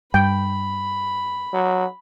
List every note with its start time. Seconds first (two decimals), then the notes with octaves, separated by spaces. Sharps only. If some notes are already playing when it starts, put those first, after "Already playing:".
0.14 G2 G5 B5
1.53 F#3